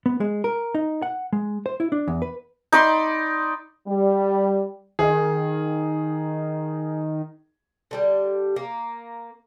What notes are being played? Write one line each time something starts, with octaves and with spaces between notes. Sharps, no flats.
B3
G#3
A#4
D#4
F#5
G#3
C5
E4
D4
E2
B4
D#4 D5 B5 C6
G3
D#3 G#4
D3 G3 G4
A#3